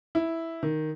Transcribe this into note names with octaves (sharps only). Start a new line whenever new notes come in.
E4
D#3